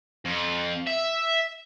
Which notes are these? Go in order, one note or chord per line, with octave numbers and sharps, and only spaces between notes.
F2
E5